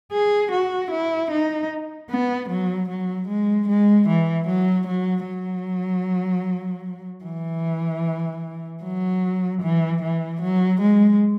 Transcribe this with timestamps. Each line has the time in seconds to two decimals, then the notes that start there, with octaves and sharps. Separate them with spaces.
0.12 G#4
0.51 F#4
0.91 E4
1.31 D#4
2.10 B3
2.49 F#3
2.89 F#3
3.28 G#3
3.68 G#3
4.08 E3
4.48 F#3
4.87 F#3
5.26 F#3
7.24 E3
8.83 F#3
9.62 E3
10.02 E3
10.42 F#3
10.81 G#3